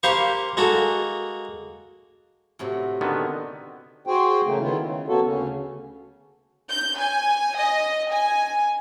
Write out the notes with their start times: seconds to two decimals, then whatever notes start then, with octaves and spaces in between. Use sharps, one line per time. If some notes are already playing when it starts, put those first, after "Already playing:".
0.03 A#3 G4 C5 F5 B5 C#6
0.57 G#3 A#3 F#4 A4
2.59 A2 C3 F#3
3.01 D3 D#3 B3
4.07 F#4 G#4 C5 G5
4.46 C#3 E3 A3 A#3
4.61 D#3 B3 E4 F4
4.80 C#3
5.08 A#3 B3 F#4 A4
5.24 D2 C#3 C#4
6.70 G6
6.99 G#5
7.57 D#5
8.12 G#5